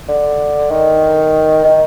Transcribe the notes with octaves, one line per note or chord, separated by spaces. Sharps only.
D3
D#3
D#3